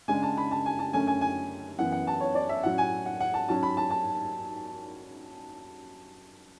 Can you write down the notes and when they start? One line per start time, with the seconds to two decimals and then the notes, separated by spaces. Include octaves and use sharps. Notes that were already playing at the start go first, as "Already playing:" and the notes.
0.08 C#3 G#3 D4 G#5
0.23 A5
0.38 B5
0.51 A5
0.66 G#5
0.79 A5
0.93 F#2 D3 A3 C#4 G#5
1.07 G#5
1.21 G#5
1.78 F#2 E3 B3 F#5
1.92 F#5
2.07 A5
2.20 C#5
2.35 D5
2.49 E5
2.63 A2 F#3 C#4 F#5
2.78 G#5
3.06 F#5
3.20 F#5
3.34 A5
3.49 G#2 F#3 C#4 A5
3.63 B5
3.77 A5
3.90 A5